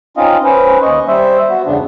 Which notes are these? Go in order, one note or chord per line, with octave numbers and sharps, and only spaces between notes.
C4 C#4 D#4 F4 D#5 F5
C#4 B4 C5
D#2 D#5 C#6
G3 C5 E5
B3 F#4
E2 G2 C#3 B3 D4